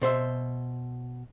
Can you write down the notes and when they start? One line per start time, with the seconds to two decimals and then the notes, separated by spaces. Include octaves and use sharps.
0.02 B2 C5 E5